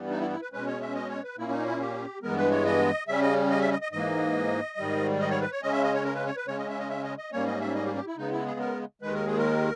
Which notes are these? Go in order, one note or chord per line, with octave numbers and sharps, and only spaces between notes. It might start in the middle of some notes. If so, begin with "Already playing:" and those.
Already playing: G2 E3 G3 B3
D#4
E4
E4
B4
B2 G#3 C#4 B4
C#5
E5
D#5
C#5
B4
A#2 A#3 C#4 E4
D#4
E4
G4
G2 E3 G#3 B3 A#4
B4
C#5
D#5
C#3 G3 C#4 E5
D#5
D#5
E5
D#5
D#5
G#2 E3 A#3 D#5
G#2 D#3 G3
D#5
C#5
B4
C#5
C#3 G#3 C#4 D#5
E5
D#5
C#5
A#4
B4
C#5
B4
C#3 G#3 C#4 C#5
D#5
E5
D#5
E5
D#5
D#5
G#2 G3 A#3 C#4 C#5
D#5
E5
D#5
G4
G4
E4
C#3 G#3 B3 D#4
E4
G#4
A#4
D#2 D#3 G#3 B4
A#4
G#4
A#4